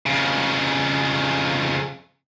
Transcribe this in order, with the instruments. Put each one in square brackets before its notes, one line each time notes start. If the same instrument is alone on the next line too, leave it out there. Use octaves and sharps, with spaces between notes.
[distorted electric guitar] F2 C#3